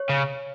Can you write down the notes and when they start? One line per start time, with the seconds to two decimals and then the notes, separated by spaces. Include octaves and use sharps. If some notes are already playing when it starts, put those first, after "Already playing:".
Already playing: C#5
0.09 C#3